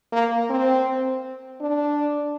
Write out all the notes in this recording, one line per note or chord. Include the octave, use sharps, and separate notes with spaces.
A#3
C4
D4